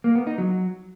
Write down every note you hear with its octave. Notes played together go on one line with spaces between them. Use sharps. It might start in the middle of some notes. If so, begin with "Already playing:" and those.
A#3
B3
D#4
F#3